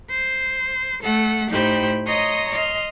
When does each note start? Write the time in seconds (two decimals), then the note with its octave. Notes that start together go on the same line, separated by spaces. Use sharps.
0.10 C5
1.04 A3 A4 F#5
1.50 A2 D#4 G4 C5 G5 B5
2.08 C#5 D#5 A#5 C6 D#6
2.53 D#5 C6 F6